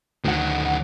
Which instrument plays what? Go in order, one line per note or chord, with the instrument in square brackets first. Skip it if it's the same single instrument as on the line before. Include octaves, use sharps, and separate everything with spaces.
[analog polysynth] D2 F#5 [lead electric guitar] D#3 F#3